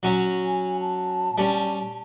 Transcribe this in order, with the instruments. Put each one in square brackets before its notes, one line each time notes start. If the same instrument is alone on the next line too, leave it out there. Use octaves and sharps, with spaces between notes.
[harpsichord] F#3 C#4
[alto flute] G#5
A5
[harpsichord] G3 C#4